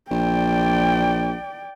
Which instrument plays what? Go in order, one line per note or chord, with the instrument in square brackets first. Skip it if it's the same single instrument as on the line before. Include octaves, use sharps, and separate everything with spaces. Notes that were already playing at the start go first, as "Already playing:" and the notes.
[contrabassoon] A#1 [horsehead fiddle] D5 G5